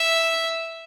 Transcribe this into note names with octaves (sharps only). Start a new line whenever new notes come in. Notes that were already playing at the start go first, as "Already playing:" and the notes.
Already playing: E5